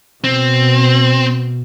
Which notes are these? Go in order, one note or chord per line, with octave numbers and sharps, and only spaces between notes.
B2 C4